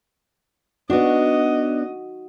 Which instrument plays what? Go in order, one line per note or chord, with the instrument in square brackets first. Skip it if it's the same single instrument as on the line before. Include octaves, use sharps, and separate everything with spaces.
[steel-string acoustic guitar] B3 D4 [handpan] D#4 F#4 [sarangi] D#5